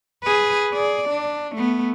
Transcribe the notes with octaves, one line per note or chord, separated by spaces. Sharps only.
G#4 B4
G#4 D5
D4
A3 B3